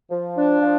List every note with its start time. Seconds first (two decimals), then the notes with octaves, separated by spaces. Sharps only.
0.11 F3
0.36 D4
0.62 F3